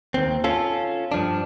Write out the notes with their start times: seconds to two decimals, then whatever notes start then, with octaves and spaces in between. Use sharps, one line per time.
0.14 D#2 C4
0.44 C#4 F4 A4
1.12 G2 F3 D4